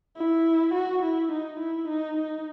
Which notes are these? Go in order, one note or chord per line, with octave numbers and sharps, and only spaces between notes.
E4
F#4
E4
D#4
E4
D#4
D#4